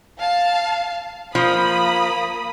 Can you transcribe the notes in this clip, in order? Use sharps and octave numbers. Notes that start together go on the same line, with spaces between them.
F5 A5
F3 A#3 B5 D#6